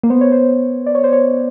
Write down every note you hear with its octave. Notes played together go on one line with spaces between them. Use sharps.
A#3
B3 C5
C#5
C5
D5
C#5
C5
C#5